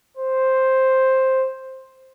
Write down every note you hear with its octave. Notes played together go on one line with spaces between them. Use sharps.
C5